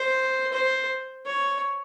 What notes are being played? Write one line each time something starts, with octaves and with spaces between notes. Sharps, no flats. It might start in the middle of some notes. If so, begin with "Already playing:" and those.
Already playing: C5
C5
C#5